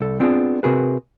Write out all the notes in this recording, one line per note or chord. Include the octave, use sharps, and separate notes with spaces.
C2 A4
B3 C4 D4 F4 G4 G#4
C3 C4 F#4 G#4 A#4 B4